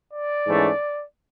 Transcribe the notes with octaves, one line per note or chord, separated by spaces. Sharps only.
D5
G#2 E3 A3 C#4